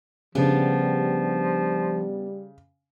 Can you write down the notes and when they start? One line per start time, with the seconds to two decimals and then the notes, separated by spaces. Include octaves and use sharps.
0.35 C#3 F3 G3 B3 D4 G4